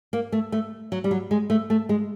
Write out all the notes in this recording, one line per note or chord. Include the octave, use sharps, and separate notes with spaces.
A#3
A3
A3
F#3
G3
F#3
G#3
A3
A3
G#3